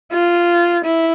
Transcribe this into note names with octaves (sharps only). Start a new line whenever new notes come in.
F4
E4